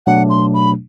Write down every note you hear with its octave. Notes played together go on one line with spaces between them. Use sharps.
B2 F#3 A3 D4 F#5
C6
B5